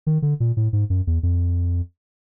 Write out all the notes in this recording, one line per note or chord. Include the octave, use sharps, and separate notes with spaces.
D#3
D3
A#2
A2
G#2
F#2
E2
F2